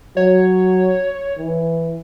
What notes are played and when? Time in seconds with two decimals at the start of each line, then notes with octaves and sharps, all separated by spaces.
0.17 F#3 C#5
1.38 E3